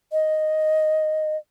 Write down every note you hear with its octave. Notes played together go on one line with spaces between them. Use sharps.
D#5